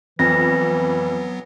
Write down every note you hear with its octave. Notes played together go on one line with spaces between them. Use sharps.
F2 E3 F#3 B3 A#6